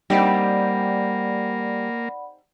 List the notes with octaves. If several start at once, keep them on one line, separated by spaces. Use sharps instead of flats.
G3 A#3 C4 D#4 G4 D5 F#5 B5